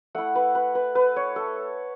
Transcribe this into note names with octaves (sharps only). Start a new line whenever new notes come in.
A3 E4 F#5
B4
B4
B4
B4
C#5
A4